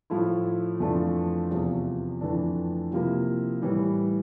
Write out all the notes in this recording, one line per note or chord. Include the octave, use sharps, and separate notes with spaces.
A2 F3 A3 E4
F2 E3 A3 D4 F4
E2 C3 F3
F2 E3 A3 D4
C3 F3 A#3 E4
A2 E3 G3